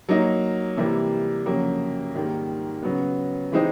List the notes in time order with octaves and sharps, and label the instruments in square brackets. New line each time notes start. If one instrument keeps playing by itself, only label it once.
[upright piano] F#3 A#3 D#4
C3 E3 G3 A#3
F2 C#3 F#3 A#3
G#2 D#3 G3 A#3
C#3 F#3 B3
E3 G#3 C4 D#4